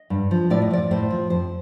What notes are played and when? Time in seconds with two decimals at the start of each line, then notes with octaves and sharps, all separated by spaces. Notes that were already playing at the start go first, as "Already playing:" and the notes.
Already playing: D#5
0.10 G2
0.31 F3
0.50 A2 D5
0.62 D#5
0.71 F3 D5
0.91 A2 C5
1.11 F3
1.30 F2 C5